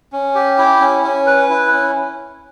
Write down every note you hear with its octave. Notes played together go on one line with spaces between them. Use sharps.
C#4
G4
E4
C#4
C#4
B4
E4
C#4